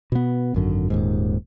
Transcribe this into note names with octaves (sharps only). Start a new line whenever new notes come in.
B2 B3
G#1 F#2 D3
D#1 D#2 G#2